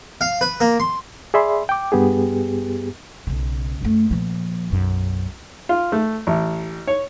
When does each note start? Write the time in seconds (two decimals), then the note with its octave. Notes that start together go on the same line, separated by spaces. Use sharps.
0.21 F5
0.41 B4
0.60 A#3
0.80 C6
1.34 G#4 D5 E5 B5 C6
1.69 G5 D6
1.92 G2 B3 G4 G#4
3.27 B1 C#3
3.81 F#2 A3
4.11 A#2 F3
4.70 B1 F#2
5.69 F4
5.92 A3
6.27 A1
6.87 C#5